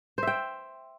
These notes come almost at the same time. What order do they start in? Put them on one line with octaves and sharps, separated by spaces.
C5 E5 G5